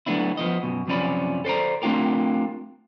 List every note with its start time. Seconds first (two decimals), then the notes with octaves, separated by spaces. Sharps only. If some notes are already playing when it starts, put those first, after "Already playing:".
0.06 F#3 A3 B3 D4 E4
0.37 F3 B3 D#5
0.63 F#2 B2
0.87 F#2 C3 F3 C#4 D5 B5
1.45 A4 C5 D5 A#5
1.82 A3 C4 D4 F4 G4 A#4